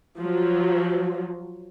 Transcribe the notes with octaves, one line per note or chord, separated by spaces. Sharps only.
F3 F#3